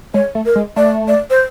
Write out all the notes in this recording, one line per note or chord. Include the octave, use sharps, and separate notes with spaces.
G#3 C#5
A3
A#4
G#3
A3 D5
D5
C5